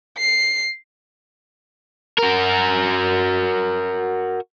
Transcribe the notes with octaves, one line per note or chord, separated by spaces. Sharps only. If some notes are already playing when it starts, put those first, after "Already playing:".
C7
F#4 A#4